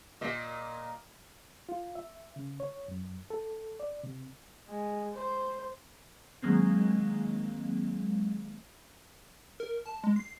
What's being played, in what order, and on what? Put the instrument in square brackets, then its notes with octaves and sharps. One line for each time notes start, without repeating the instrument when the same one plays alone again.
[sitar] A#2 D#5
[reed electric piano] F4
E5
C#3
C#5
F#2
A4
D5
C3
[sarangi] G#3
C5
[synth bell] D#3 F#3 G#3 A#3 C4
[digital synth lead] A#4
A5
G#3
C7